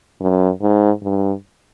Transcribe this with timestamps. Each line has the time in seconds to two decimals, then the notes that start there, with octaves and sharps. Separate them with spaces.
0.21 F#2
0.62 G#2
1.03 G2